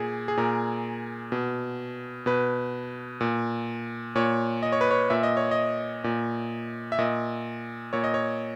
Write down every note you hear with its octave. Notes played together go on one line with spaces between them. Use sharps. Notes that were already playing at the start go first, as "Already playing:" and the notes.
Already playing: A#2 G#4
G#4
A#2 A#4
B2
B2 B4
A#2
A#2 C#5
D#5
C#5
B4
C#5
A#2 E5
D#5
C#5
D#5
A#2
E5
A#2 D#5
A#2 C#5
D#5
C#5